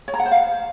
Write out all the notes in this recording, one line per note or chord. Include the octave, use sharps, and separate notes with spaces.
C#5
A#5
F#5
C5
F5